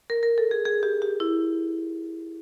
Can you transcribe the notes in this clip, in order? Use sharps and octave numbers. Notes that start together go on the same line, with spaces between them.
A#4
A#4
A4
G#4
G#4
G4
G4
E4